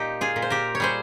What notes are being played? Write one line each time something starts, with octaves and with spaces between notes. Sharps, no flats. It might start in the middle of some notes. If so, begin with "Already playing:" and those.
Already playing: A#2 D#4 G4
F4 G#4
A#2
C5
G4 A#4
C#5
G3 G#4 C5